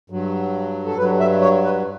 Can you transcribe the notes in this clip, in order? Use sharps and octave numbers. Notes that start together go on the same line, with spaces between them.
G2 F#3
A4
G2 F#3 B4
E5
C#5
B4